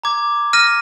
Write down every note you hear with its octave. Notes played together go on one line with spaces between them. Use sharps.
A#5 D6 G#6
F6 A#6 D#7